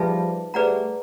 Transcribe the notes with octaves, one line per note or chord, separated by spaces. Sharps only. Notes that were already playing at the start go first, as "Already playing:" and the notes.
Already playing: F3 G3 D#4 G#4 B4 E5 A5
G3 A3 G#4 B4 D5 F#5 A#5